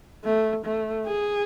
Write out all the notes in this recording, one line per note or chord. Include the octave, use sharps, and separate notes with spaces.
A3
A3
G#4